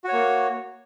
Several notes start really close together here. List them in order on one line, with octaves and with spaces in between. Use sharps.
F#4 C#5 A#3